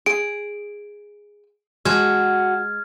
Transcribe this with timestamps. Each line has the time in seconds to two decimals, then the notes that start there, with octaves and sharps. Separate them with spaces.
0.06 G#4 D7
1.85 G#3 F#4 F#5 A5 F6 G#6